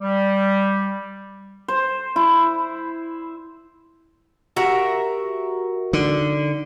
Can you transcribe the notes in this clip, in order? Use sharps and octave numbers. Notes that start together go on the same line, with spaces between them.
G3
C5
E4
F#4 G4 A#4 E5
D3 D#4